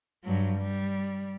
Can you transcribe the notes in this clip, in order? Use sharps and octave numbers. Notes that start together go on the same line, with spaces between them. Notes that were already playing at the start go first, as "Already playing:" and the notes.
G2 F#3
G3